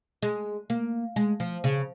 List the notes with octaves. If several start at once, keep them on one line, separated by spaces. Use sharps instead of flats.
G#3
A#3
G#3
F3
C#3